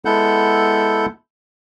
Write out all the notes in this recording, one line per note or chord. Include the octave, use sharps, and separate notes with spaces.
G#3 B3 E4 A4 F#5 G6